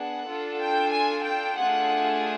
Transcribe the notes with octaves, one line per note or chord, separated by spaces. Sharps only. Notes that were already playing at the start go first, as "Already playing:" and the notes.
Already playing: B3 D4 G#4 F#5
D4 F4 A4
G5
G#5
G5
A3 D4 F4 G#4 F#5